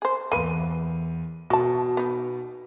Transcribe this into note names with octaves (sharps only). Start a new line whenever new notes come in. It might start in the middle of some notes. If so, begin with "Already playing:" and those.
G#4 C5
E2 A#3 B4 D#7
B2 F#4 A5
B3 D#4